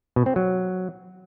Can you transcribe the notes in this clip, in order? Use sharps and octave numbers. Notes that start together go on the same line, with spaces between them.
B2
C4
F#3